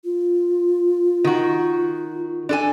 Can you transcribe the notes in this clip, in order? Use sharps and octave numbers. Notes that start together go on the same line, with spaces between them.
F4
D#3 F#4
D4 A4 G#5